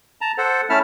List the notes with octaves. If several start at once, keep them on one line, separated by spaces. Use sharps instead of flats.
A5 A#5
A4 C5 F#5
A3 C#4 E4 E5 A5 F6